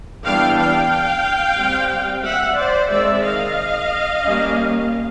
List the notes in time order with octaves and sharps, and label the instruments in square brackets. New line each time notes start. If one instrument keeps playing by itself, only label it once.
[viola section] E3 G3 B3 D4 F5 G5
F5 G5
G3 C4
E5 F#5
C5 D5
D#3 G#3 C4 D5 E5
D#5 F5
G3 A#3 C#4